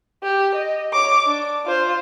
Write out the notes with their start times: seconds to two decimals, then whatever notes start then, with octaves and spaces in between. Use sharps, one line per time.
0.23 G4
0.55 D#5
0.93 C#5 D6
1.27 D4
1.66 F4 C5